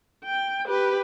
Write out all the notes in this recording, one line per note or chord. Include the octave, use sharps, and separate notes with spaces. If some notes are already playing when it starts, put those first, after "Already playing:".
G5
G4 B4